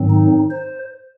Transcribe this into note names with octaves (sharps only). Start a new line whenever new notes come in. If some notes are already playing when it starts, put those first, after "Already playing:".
Already playing: G#2 D#3 F#3 C4
D#4
C5